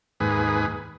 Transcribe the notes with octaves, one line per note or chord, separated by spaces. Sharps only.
D#2 G#2 G#4 B4